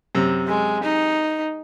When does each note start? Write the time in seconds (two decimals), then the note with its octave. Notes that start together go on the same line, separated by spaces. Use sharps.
0.15 F#2 C3
0.47 G#3
0.83 D#4